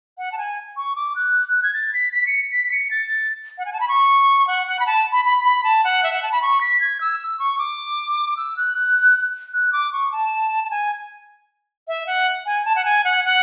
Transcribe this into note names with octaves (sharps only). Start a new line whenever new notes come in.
F#5
A5
G#5
C#6
D6
F#6
G#6
A6
B6
B6
C#7
B6
B6
C#7
A6
F#5
G#5
A5
B5
C#6
F#5
F#5
B5
A5
B5
B5
B5
A5
F#5
E5
F#5
A5
B5
C#6
B6
G#6
E6
E6
C#6
D6
E6
F#6
F#6
D6
C#6
A5
A5
G#5
E5
F#5
G#5
A5
F#5
G#5
F#5
F#5